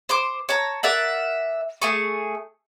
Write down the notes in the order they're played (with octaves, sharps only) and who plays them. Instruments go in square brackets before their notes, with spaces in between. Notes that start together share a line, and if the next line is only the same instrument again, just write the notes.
[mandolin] C5 C6 D6
C#5 A5 A#5
A#4 D5 E5 F#5
A3 G#4 C#6